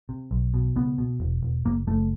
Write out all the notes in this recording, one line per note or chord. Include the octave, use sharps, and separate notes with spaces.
C3
B1
B2
C#2 B3
B2
E1
E1
F#1 A#3
F#1 A3